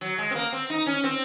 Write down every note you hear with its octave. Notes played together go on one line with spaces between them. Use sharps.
F#3
G#3
C4
A#3
C4
D#4
C#4
C4